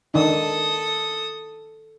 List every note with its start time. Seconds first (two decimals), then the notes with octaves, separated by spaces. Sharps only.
0.14 D#3 D4 D#4 A4 D#6